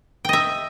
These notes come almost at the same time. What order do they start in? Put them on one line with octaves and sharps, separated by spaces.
G5 D#5 E5